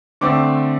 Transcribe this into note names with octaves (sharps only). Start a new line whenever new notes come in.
D3 A3 C4 D6